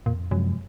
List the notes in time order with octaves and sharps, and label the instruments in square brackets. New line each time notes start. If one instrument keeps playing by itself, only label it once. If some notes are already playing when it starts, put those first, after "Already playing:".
[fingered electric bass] F2 [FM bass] A#2
[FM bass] F#2 [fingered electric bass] C3 F3 G#3